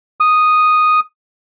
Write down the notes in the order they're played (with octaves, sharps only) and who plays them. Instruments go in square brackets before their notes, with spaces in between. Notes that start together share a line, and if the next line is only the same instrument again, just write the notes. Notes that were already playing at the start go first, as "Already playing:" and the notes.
[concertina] D#6